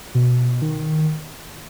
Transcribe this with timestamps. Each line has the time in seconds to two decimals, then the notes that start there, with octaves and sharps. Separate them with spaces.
0.15 B2
0.62 D#3